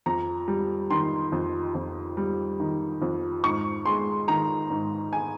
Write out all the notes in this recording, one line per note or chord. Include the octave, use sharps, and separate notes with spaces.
F2 A#5
G3
D#3 C6
F2
F2
G3
D#3
F2
G#2 C#6
G#3 C6
D#3 A#5
G#2
G#5